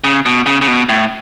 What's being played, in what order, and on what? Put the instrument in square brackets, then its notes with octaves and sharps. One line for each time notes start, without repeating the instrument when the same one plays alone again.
[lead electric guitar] C#3
B2
C#3
C#3
B2
A2